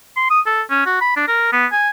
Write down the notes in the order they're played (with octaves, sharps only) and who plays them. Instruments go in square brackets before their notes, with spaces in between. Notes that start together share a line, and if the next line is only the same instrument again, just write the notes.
[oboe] C6
D#6
A4
C#4
F#4
B5
D4
A#4
B3
G#5